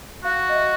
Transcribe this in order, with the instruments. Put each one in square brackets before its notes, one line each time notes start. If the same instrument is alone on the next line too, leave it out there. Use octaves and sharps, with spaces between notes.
[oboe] F#4 [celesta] F5
[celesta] D#5
E5